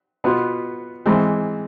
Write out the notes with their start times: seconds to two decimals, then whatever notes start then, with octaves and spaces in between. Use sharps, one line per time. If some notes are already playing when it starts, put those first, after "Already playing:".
0.24 B2 B3 F4
1.06 G#2 E3 G#3 C4